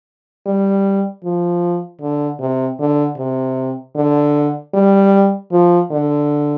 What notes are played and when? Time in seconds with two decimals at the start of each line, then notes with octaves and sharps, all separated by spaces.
0.47 G3
1.24 F3
2.01 D3
2.40 C3
2.80 D3
3.18 C3
3.96 D3
4.74 G3
5.52 F3
5.91 D3